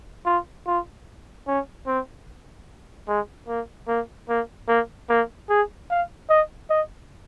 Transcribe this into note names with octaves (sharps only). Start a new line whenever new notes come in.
F4
F4
C#4
C4
G#3
A#3
A#3
A#3
A#3
A#3
G#4
F5
D#5
D#5